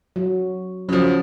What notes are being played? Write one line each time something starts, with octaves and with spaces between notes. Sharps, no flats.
F#3
C#3 F3 F#3